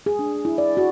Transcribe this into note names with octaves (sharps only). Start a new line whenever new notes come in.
G#4
D4
E4
D5
F#4